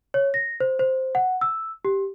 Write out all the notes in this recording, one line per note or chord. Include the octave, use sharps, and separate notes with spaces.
C#5
A#6
C5
C5
F#5
E6
G4